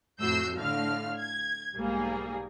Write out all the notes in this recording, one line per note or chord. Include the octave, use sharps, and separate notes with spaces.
F2 A2 F#4 E6 G6 C7
A2 D3 A3 F5 F6
G#6
B1 G#2 G3 A#3 G#4